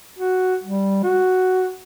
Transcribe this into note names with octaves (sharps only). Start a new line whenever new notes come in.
F#4
G3
F#4